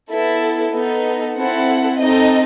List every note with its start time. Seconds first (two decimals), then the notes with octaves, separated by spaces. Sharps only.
0.11 B3 E4 A4
0.73 B3 D#4 A4
1.36 C4 E4 A4 F#5
1.98 C4 D#4 A4 D#5